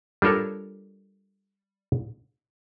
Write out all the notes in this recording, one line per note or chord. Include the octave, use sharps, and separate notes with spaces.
G3 D4 F4 A4 A#4 C#5